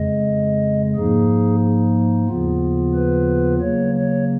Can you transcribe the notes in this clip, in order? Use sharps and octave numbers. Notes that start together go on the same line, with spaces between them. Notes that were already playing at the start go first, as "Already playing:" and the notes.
Already playing: F2 C#3 G#3 D#5
G#2 F3 A#3 D#4 G#4
D#2 C#3 F3 B3 F4
B4
C#3 F#3 A#3 C#5
C#5